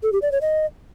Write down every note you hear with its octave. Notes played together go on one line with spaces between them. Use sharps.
A4
G4
D5
C#5
D#5